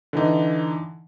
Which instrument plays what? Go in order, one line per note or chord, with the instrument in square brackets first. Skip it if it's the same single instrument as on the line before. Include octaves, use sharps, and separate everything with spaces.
[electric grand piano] D3 E3 D#4